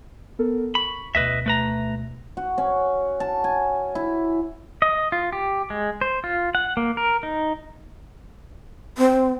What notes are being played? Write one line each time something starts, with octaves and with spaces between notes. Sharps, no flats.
B3 A4 A#4
B5 C#6
D2 B2 B4 D#5 E5
A3 B4 A#5
F#4
C#4
A5
G#5
E4
D#5
F4
G4
G#3
C5
F4
F#5
A#3
A#4
D#4
C4